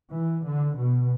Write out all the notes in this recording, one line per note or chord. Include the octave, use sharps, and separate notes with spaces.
E3
D3
B2